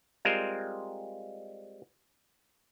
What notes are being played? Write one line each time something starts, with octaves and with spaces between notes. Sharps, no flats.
G3 G#3 C4 F4 A#4 C5